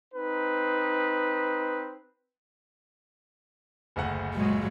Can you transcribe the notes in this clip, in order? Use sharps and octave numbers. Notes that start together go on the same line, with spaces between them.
C4 D#4 B4
F#1 D2 F#5
A#2 F#3 G#3